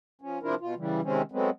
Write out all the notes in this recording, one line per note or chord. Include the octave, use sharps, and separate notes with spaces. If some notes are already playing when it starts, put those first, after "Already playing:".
F3 C#4
C3 F3 D4 E4 F4 A#4
B2 F4
C#3 E3 G3
C3 D#3 G#3 C4 C#4
F#3 G#3 A3 B3 C4